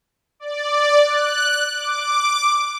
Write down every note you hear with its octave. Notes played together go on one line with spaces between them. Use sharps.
D5
F#6
D6